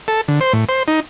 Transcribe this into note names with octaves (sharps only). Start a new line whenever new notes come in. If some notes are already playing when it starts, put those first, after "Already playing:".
A4
D3
C5
A2
C5
D#4